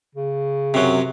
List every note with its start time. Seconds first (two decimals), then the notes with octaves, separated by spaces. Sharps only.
0.15 C#3
0.74 F#2 C3 F#3